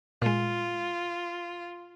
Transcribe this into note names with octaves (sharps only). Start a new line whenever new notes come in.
A#2 G#3 F4